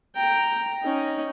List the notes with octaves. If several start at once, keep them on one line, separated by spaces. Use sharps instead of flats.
G5 A#5
C#4 D#4